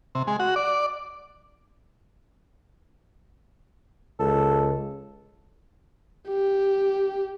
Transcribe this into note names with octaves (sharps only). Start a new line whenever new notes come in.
C3
G#3
F#4
D5
C#2 A4
G4